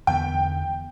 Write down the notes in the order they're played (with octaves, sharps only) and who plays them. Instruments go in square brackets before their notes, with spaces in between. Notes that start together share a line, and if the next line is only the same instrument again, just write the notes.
[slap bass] E2 D3 B3 [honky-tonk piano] G5